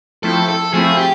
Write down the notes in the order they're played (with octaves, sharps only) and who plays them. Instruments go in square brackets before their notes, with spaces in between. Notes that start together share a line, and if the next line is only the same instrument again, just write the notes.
[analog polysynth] F3 A3 C4 E4 [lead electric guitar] A4
[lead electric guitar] A4
[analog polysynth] F3 A3 C4 E4 [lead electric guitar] G#4
[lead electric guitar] G4